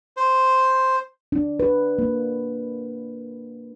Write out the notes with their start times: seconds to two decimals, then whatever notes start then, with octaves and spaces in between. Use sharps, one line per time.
0.17 C5
1.32 D4
1.60 B4
1.99 A#3